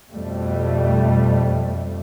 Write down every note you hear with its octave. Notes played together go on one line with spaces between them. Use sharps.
F2 B2 G3 A3